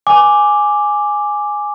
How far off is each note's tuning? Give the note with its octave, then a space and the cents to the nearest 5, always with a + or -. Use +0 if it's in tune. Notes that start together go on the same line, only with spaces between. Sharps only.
G#5 +0 D6 +0